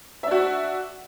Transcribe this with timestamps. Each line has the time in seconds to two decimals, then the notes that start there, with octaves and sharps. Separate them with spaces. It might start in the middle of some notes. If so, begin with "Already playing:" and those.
0.23 E5
0.27 D4
0.31 F#4